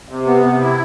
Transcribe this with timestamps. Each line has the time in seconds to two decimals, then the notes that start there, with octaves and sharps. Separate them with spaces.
0.08 C3
0.26 B3
0.44 C3
0.60 E4